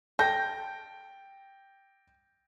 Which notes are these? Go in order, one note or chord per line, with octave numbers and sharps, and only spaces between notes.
A4 G5 G6 A#6